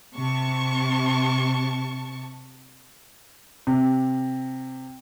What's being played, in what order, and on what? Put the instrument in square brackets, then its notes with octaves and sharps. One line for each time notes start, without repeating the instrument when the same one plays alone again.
[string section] C3 A5 C#6
[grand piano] C3